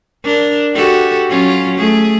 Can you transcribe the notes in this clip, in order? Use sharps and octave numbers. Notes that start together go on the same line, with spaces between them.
D4 A#4
F#4 G4 A4
F#3 C#4 F4
A3 G#4